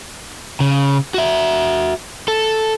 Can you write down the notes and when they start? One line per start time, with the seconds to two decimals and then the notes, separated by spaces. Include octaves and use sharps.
0.60 C#3
1.14 F#4 E5
2.28 A4